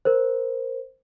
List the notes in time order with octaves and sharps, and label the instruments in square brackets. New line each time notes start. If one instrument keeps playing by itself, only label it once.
[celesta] A#4 C5